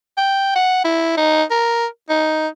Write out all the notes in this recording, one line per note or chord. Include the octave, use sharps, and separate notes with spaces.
G5
F#5
E4
D#4
A#4
D#4